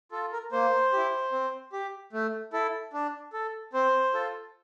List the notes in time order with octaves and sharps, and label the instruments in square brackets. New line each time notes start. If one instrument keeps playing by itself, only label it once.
[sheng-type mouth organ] F4 A4
A#4
A#3 C5
E4 G4
C4
G4
A3
E4 A4
D4
A4
C4 C5
F4 A4